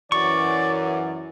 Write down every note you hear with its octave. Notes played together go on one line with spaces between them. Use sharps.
F#2 E3 D5 C#6